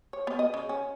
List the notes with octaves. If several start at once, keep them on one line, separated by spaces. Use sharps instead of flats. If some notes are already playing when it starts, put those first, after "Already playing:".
C#5
B3
D#5
C#3
C#4